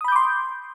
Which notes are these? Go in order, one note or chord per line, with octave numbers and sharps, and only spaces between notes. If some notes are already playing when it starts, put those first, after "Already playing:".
B5 C6 D6 D#6 G6